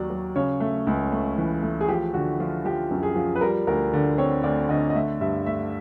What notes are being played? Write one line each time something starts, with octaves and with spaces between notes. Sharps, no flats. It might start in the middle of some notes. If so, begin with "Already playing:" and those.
Already playing: D#2 F#3 D5
F#3
C#3 C#5
A3
C#2
A3
E3
A3
G#4
F3 G4
D3 F#4
F3 F4
F3 G4
F#2
G#4
F3
B4
G3 A#4
D2 A#4
D3
C4 C#5
D2 D5
D3 D#5
D#5
A3 E5
G2 E5
A3 E5